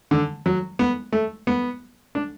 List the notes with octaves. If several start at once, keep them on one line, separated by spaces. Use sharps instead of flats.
D3
F#3
B3
A3
B3
D4